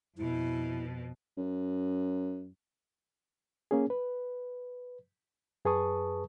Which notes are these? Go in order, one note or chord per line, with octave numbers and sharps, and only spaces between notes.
F2 B2 E4
F#2
A#3 C#4 G#4
B4
F#2 G#4 B4 A5 C#6 D#6